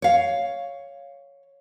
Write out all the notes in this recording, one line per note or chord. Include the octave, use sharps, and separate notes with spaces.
C#5 F5